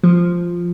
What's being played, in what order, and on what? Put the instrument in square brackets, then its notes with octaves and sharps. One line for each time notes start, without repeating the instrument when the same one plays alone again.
[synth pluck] F3